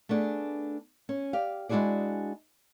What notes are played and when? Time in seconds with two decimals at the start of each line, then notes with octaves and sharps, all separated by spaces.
0.09 A3 B3 D4 G#4
1.09 C#4
1.33 G4 D5 F5
1.69 G#3 D4 E4 F#4 G#4 D5